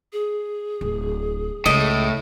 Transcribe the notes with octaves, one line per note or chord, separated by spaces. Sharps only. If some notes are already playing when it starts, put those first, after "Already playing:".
G#4
D1
C#2 A2 D#5